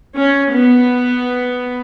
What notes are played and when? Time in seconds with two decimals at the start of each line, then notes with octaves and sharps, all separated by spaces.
0.15 C#4
0.51 B3